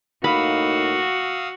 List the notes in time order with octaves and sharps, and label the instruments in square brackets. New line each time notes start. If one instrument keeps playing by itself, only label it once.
[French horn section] A2 A#3 D#4 [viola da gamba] F#4 [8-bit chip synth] F5 D#6 E6 [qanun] B5